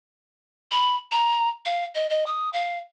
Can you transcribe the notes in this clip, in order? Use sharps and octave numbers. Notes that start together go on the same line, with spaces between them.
B5
A#5
F5
D#5
D#5
D#6
F5